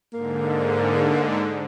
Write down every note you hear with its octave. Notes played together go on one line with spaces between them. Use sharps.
G#2 D3 A#3